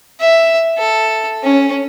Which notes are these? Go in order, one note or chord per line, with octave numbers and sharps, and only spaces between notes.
E5
A4
C#4